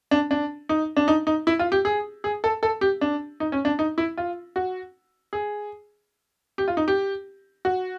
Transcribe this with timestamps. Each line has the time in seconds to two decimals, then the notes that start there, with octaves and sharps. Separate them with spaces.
0.11 D4
0.31 D4
0.69 D#4
0.97 D4
1.08 D#4
1.27 D#4
1.47 E4
1.59 F4
1.72 G4
1.85 G#4
2.24 G#4
2.44 A4
2.63 A4
2.81 G4
3.01 D4
3.40 D#4
3.52 C#4
3.65 D4
3.79 D#4
3.98 E4
4.17 F4
4.56 F#4
5.33 G#4
6.58 G4
6.68 F4
6.77 D#4
6.88 G4
7.65 F#4